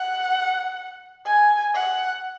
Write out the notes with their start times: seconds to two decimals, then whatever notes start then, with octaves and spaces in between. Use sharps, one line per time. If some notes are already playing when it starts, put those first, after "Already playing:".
Already playing: F#5
1.25 G#5
1.74 F#5